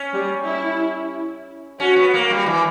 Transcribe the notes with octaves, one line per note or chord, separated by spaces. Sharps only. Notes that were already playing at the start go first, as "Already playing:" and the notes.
Already playing: C#4
G3
E4
C#4 F#4
B3
A#3
G3
E3